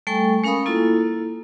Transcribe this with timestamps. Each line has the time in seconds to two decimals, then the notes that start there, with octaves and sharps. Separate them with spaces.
0.07 G3 A3 A4 G5 G#5 C#6
0.44 G#3 C#4 A#4 F5 B5 D#6
0.66 A#3 E4 F4 A4